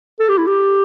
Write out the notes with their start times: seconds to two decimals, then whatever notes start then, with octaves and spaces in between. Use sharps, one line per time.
0.19 A4
0.29 G4
0.38 E4
0.47 G4